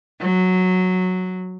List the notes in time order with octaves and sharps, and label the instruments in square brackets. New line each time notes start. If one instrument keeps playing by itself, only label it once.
[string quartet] F#3